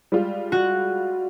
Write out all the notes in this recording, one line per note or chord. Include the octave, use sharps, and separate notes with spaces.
G3 G#3 F4
F#4 F#6